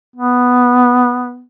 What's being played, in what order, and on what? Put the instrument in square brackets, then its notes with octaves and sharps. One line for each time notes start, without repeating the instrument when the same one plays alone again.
[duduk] B3